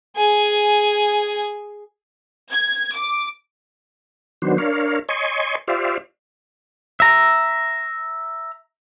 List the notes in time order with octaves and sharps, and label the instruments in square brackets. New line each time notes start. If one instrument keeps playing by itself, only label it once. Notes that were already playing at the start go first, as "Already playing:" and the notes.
[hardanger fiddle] G#4 G#5
[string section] G#6
D6
[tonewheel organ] D#3 F#3 B3 D4 F#4 C5
D4 A#4 C#5 F5
C#5 D#5 G#5 C6 C#6
F4 G4 C5 D5 E5 F5
[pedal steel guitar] E5 A#5